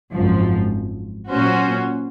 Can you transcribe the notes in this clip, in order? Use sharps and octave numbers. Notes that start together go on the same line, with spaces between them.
G#1 F#2 F3
A#2 F#3 C#4 F#4 C5